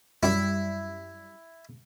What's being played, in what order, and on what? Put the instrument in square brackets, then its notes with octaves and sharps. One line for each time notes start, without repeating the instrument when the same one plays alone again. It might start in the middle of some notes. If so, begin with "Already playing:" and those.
[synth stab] F#2 G3 [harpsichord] E4